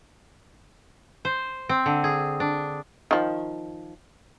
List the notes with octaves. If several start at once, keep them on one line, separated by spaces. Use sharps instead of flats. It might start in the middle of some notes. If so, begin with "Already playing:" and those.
C5
C4
D3
G#4
D4
D#3 F3